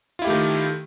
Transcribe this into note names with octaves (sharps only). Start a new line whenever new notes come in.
D#3 A3 E4 F4 G4